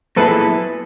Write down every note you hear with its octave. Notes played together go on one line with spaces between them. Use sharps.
A#2 F#3 B3 E4 G#4 A4 B4